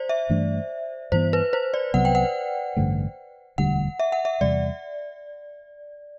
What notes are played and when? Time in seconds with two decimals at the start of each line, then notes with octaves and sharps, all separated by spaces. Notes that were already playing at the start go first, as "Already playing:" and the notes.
Already playing: C5 D5
0.09 E5
0.30 G2 E3 A3 D4
1.12 G2 E3 B3 C5
1.33 B4
1.53 C5
1.74 D5
1.94 C2 C3 F#3 B3 F#5
2.05 G5
2.15 F#5
2.77 A1 G2 D3 A3
3.58 E1 D2 D3 G3 F#5
3.99 E5
4.12 F#5
4.25 E5
4.41 E2 C3 G3 D5